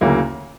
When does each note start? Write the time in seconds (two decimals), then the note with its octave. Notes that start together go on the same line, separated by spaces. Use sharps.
0.01 D2 C#3 F#3 A#3 E4